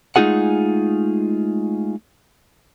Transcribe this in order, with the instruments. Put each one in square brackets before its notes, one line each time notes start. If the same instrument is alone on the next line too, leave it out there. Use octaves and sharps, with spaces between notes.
[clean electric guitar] G#3 A3 D#4 F4 G#4 F#5